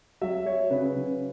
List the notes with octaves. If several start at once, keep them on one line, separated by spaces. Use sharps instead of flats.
F#3 E5
F#3 C#5
C#3 B4
C#3